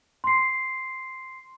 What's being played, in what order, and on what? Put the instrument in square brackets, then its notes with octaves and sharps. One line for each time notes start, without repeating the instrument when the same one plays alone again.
[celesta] C6 C7